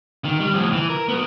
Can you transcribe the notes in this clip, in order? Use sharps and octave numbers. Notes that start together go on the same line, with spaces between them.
D#3
G3
F2 A2
E3
A#4
F#3 B3